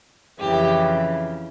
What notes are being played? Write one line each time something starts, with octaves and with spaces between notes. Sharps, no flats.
F2 C#3 E3 G4